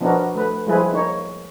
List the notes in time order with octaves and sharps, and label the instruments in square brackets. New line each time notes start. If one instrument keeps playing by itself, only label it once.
[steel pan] F3 B3 D4 D#4 F#4 A#4
A3 B4
F3 G3 G#3 E4 G#4 B4
A#3 D#4 C#5